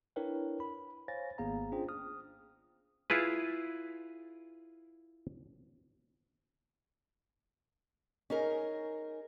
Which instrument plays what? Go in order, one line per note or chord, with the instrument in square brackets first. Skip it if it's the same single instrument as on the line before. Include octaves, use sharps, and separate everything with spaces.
[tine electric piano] D4 E4 A#4 B4 C#5 G5
B5
C5 C#5 F5 G#5 A6 A#6
G#1 A#3 B3 G#4 F5 A#5
C#4 D4 F4 G#4 C5 G5
D#6 F6
[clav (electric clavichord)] E4 F4 G#4 B4
[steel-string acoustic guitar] C#4 D#4 G#4 A#4